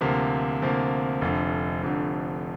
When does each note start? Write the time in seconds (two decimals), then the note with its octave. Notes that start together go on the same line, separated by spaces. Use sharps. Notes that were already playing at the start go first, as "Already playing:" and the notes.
0.01 D2 C3 F3 A#3
0.62 D2 C3 F3 A#3
1.21 F1 F2 D3
1.83 F1 F2 D3